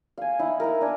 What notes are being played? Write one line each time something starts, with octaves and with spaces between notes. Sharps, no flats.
F5 G#5
D#4 E4
E4 A#4
D4 G#5